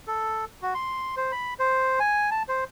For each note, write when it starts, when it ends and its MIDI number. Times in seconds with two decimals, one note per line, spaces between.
0.07 0.45 69
0.62 0.74 66
0.74 1.15 84
1.17 1.32 72
1.32 1.54 83
1.59 1.99 72
2.00 2.30 80
2.31 2.43 81
2.49 2.64 72